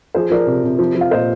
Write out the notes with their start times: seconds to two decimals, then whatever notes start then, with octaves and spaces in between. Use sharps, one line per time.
0.14 F3 G#4 C5
0.31 F3 A#4 D5
0.47 C3
0.64 C3
0.79 F3
0.95 F3
1.01 F5
1.11 A#2 C5 D#5